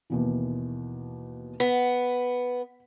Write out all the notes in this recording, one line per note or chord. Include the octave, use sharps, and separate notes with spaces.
D#2 B2 E3
B3 B6